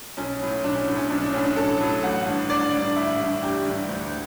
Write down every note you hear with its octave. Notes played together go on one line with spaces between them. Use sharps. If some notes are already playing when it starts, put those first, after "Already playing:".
B1 C#4
A2 F#3
B1 D4
C#4
A2 F#3
C#4
B1 D4
D4
A2 F#3 C#4
D4
B1 A4
A2 F#3
A1 F#5
G2 D3
A1 D5
G2 D3
A1 E4
G2 D3
A1 G4
G2 D3
D2